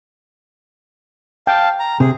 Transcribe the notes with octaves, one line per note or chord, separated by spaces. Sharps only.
F5 G5 A5
A#5
C3 G#4